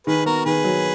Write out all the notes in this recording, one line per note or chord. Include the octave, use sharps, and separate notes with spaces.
D#3 G#4 B4
B3 F#4 A#4
D#3 G#4 B4
F#3